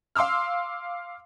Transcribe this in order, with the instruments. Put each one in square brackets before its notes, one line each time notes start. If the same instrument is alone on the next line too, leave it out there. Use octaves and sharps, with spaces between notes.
[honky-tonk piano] F5 C6 D6 E6 F6